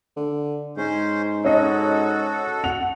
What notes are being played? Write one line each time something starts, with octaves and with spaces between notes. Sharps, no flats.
D3
G#2 C#4 C5
C#4 F#4 A4 D#5
F#5 F7